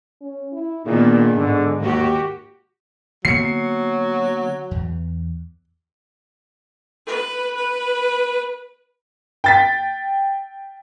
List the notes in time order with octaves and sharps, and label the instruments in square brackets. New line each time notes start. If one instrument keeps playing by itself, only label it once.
[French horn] C#4
E4
[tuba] A#2 [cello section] D#3 B3 D4 [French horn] G#4
[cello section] G#2 [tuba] D3
[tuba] D#2 [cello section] F#4 G4
[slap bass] D3 A#3 B3 [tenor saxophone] F#3 [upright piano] C7 C#7
[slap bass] E2
[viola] B4
B4
[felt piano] G5 A6 B6